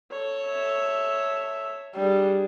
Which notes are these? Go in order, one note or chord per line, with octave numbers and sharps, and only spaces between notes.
A4 C#5
E5
G3 D4 G#4